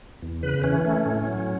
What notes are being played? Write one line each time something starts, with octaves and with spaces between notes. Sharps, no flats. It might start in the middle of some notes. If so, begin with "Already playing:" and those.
E2
C#3 B4
E3 C#4
A3 C#4
A2
F#3